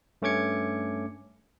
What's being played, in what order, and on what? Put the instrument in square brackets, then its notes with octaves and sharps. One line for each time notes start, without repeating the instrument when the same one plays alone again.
[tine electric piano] G2 A3 C#4 D6 G#6 C#7